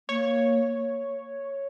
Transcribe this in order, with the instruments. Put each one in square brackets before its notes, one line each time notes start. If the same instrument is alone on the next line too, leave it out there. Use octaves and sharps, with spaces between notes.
[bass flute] A#3 [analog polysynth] C#5